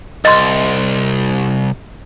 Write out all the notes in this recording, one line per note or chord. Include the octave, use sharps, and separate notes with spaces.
C2 D#5 C6